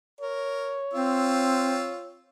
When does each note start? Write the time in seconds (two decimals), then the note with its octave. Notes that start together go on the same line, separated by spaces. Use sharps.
0.21 A#4 C#5
0.94 C4 F4 E6